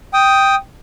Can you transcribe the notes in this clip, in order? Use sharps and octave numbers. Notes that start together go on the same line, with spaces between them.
G5 D#6